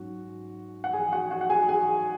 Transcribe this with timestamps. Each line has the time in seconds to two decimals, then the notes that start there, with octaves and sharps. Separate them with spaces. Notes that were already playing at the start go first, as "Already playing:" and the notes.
Already playing: G#2 F#3 C#4 F#4
0.84 F#5
0.93 G#4 G#5
1.12 F#4 F#5
1.31 F#4 F#5
1.41 F#5
1.50 G#4 G#5
1.68 G#4 G#5